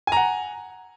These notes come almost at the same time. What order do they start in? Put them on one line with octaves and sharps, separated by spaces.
G#5 A#5 F#5